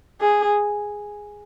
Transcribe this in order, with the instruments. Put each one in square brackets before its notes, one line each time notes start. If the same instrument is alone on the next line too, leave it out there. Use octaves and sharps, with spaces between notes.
[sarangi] G#4